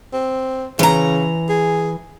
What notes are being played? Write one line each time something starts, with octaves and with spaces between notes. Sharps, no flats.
C4
C#3 E3 A#5
G#4